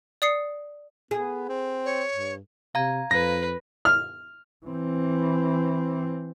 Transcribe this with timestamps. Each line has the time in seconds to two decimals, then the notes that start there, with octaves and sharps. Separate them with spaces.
0.22 D5 D#6 C7 C#7
1.11 B3 G#4
1.49 C4
1.85 C#5
2.14 G2
2.75 C3 F5 A#5 G#6
3.11 F2 B4 A#6
3.85 F6
4.66 E3 C4